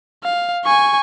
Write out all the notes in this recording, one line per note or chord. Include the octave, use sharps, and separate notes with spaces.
F5
G#5 C#6